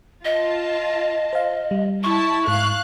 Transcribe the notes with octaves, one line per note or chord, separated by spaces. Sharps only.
F4 D#5 A5
C5 F5
G3
E4 A5 C#6
G#2 F5 F#6